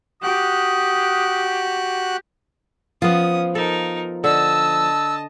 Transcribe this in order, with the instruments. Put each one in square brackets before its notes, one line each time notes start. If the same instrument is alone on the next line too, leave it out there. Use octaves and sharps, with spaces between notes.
[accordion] F#4 F#6 [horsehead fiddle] G4 [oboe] D#6
[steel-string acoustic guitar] F3 [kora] B3 F4 [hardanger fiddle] C#4 D#6
[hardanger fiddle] D#4 A#4 [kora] A4
[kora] D3 [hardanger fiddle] D#5 A5 [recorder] E6